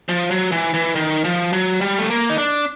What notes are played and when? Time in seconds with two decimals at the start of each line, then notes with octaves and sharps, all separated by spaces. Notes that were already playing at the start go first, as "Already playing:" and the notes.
0.09 F3
0.31 F#3
0.52 E3
0.74 E3
0.95 D#3
1.24 F3
1.53 F#3
1.81 G3
1.98 A3
2.10 A#3
2.30 D#4
2.38 D4